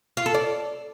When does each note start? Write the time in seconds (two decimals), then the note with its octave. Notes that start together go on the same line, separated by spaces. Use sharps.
0.17 F4
0.26 A4
0.34 D5